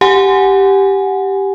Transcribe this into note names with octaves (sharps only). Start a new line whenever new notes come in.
G4 F#5 G#5